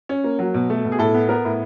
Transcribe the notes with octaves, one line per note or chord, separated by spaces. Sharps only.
C#4
A#3
F#3
B2
A3
B2
G#4
A2 A4
B3
B3 A#4
A2